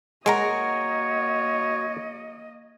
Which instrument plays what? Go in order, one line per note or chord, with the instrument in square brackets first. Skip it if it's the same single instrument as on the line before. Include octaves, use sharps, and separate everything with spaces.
[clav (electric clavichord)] G#3 A#5 [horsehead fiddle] A#3 D#5 [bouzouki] F#4 A#4 [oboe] C#5